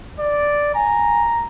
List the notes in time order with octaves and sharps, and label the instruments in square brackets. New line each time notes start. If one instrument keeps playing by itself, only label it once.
[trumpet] D5
[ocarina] G#5 [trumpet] A#5